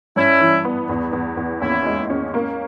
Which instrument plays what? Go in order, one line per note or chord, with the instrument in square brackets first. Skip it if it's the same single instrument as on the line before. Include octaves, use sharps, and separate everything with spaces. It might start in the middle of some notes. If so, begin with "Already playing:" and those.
[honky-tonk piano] G2 [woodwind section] C#4 E4
[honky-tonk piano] E3
B3
E2
E2
E2
[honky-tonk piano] D#2 [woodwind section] C#4 E4
[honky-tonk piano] G#3
C#4
A#3